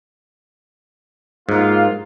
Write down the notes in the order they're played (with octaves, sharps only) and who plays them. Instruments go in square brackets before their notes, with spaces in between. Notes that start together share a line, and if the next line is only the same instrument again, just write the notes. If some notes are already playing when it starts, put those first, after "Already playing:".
[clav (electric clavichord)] G#2 [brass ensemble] A#3 F4